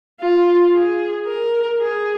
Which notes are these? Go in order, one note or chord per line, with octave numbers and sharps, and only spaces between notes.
F4
G#4
A#4
G#4